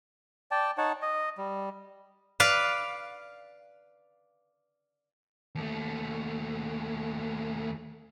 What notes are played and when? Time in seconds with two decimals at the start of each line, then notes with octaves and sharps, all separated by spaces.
0.51 D5 G5 A5
0.78 D#4 C#5 F#5 A5
1.02 D#5
1.38 G3
2.40 B4 D5 F5
5.55 D#2 A3